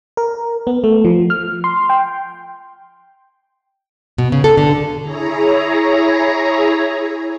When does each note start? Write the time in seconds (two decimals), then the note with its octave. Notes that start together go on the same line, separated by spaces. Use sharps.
0.17 A#4
0.67 B3
0.84 A3
1.05 F3
1.30 F6
1.64 C6
1.90 G5
4.18 B2
4.32 C#3
4.44 A4
4.57 D3
5.02 E4 G#4 C#5 A#5